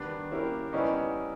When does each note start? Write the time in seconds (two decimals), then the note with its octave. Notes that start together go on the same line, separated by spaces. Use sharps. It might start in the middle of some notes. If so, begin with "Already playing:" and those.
Already playing: D#3 G3 B3 D4
0.31 A#3 C#4 E4 G4 A#4
0.73 G3 B3 C#4 D#4 E4